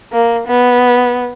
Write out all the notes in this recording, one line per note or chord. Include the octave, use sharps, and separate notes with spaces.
A#3
B3